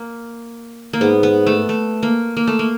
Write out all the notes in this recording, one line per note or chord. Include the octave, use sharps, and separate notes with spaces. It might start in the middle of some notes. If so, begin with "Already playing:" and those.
Already playing: A#3
A#3
G#2 B3
B3
A3
A3
A#3
A#3
A3
A#3